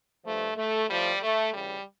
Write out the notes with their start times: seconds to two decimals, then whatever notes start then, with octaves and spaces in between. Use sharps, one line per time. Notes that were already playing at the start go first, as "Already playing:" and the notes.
0.25 G2 F3 A3
0.56 A3
0.89 A2 F3 G3
1.22 A3
1.53 D2 C#3 E3 G3